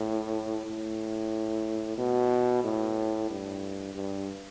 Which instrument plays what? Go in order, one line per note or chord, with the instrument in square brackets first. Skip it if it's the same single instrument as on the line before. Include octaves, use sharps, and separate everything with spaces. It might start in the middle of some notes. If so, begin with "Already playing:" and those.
Already playing: [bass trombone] A2
A2
B2
A2
G2
G2